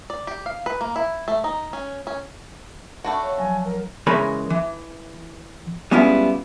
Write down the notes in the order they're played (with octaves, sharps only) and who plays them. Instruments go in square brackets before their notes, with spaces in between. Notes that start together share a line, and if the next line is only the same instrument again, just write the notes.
[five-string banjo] D5
G4
F5
B4
A#3
E4
A3
D#4
C#4
C#4
[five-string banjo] A3 D4 F#4 [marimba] A4 B5
[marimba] C#5 F5
[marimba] F3 F#3 [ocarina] G#5
[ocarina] A#4
[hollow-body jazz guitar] C#3 E3 G#3 A#4 C#5 B5
E3
G3 G#3 B3 C#4 E4 F4